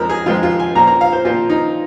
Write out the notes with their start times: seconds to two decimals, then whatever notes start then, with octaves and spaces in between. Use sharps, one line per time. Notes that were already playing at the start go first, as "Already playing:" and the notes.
Already playing: F2 F3 G#3 A#4
0.09 G#4
0.26 F2 F3 G#3 F4
0.43 F4
0.60 G#5
0.75 A#2 F3 A#3 A#5
0.87 A#5
1.01 F5
1.13 C5
1.24 A#2 F3 A#3 F4
1.49 D#4